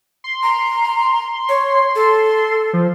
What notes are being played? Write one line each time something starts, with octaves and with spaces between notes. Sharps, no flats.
C6
A#5
C#5
A4
F3